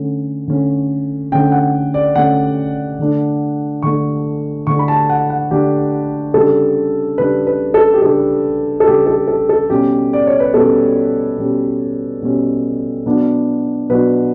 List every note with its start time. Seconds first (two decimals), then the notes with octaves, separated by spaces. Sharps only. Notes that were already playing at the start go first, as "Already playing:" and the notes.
Already playing: D3 A3 C#4
0.48 D3 A3 C#4
1.32 D3 A3 C#4 G5
1.52 F#5
1.94 D5
2.16 D3 A3 C#4 F#5
2.99 D3 A3 D4
3.83 D3 A3 D4 C#6
4.67 D3 A3 D4 C#6
4.79 B5
4.88 A5
5.09 F#5
5.30 F#5
5.51 D3 A3 D4 G4
6.34 C#3 G3 D4 A4
7.18 C#3 G3 D4 B4
7.47 B4
7.74 A4
7.94 G4
8.02 C#3 G3 D4 A4
8.80 A4
8.86 C#3 G3 D4 G4
9.07 A4
9.28 A4
9.49 A4
9.70 B2 G3 C#4 G4
10.13 D5
10.27 C#5
10.40 B4
10.53 B2 G3 C#4 A4
11.38 B2 G3 C#4
12.22 B2 G3 C#4
13.06 B2 F#3 B3 D4
13.89 B2 F#3 B3 D4 B4